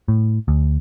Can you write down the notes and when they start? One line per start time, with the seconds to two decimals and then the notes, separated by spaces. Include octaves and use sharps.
0.08 A2
0.48 D2